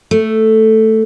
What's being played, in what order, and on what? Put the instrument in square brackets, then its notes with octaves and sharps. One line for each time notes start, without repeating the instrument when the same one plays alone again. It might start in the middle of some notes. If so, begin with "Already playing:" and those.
[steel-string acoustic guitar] A3